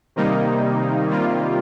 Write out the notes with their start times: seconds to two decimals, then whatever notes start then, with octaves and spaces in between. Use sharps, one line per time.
0.16 C3 D#3 G3 A#3 D#4
1.08 C3 D#3 G3 A#3 F4